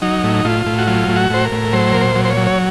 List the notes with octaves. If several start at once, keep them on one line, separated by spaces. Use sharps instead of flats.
F#3 D#4
A2
A2 F4
A2
F#4
F#3 F4
A2
F#4
A2 C5
A#4
A2
F#3 C5
A#2 A#4
C5
F#3
C5
C#5
F#3
C#5